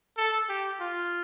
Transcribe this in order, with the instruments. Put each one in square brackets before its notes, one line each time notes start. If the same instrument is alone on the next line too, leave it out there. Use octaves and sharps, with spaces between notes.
[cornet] A4
G4
F4